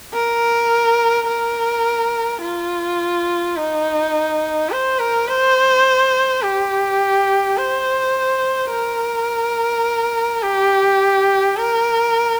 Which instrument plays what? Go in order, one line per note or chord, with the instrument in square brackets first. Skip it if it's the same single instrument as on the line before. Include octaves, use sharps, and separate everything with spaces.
[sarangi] A#4
A#4
F4
D#4
C5
A#4
C5
G4
C5
A#4
G4
A#4